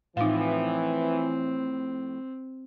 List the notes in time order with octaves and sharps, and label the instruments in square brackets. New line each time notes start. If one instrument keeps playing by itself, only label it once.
[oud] A2 F3 F4 [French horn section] E3 [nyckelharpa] C4 [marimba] D#4 F5